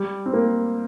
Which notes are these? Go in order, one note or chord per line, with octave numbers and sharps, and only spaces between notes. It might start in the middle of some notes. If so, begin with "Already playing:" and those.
Already playing: G3
C4
A#3